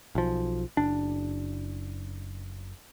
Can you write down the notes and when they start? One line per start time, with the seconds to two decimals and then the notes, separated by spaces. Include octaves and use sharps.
0.15 B1 F3
0.77 F#1 D4